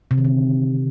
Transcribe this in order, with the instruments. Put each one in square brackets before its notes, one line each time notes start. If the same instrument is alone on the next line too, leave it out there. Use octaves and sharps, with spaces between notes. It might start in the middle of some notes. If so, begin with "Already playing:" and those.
[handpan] C3
D#3
D3